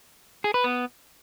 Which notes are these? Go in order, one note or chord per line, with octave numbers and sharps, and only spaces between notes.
G#4
B4
B3